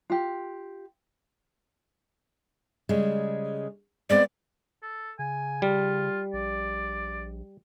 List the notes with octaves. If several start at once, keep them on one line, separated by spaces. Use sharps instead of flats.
F4 G4
C#3 G3 G#3
G#3 B3 C4 D5
A4
C#3 G#5
G3 F4
A#1 D5